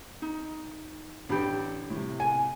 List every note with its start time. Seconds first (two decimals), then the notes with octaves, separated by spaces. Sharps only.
0.22 D#4
1.29 A1 D4 G4 B5
1.90 A2 C3
2.20 G#5